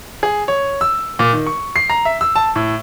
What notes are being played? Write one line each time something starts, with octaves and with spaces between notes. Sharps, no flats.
G#4
C#5
E6
A#2
D#3
C#6
C7
A#5
E5
E6
A5
A2